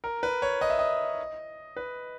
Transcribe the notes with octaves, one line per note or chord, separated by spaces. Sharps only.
A#4
B4
C#5
D#5
E5
D#5
B4